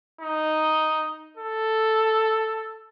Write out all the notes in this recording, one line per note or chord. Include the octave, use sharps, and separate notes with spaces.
D#4
A4